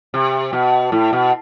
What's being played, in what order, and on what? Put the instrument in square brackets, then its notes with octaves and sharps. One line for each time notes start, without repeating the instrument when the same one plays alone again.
[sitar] C3
B2
A2
B2